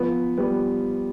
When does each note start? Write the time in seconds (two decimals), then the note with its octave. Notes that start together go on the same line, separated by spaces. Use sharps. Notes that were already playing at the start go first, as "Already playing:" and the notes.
Already playing: F3 B3
0.38 G3 B3